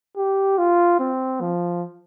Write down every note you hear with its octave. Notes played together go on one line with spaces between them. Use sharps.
G4
F4
C4
F3